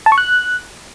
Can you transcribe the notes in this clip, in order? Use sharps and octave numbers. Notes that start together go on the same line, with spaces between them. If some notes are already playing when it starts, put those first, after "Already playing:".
A5
C#6
F#6